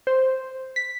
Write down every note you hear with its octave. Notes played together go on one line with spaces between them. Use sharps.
C5
B6